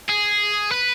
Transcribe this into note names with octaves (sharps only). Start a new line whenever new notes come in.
G#4
B4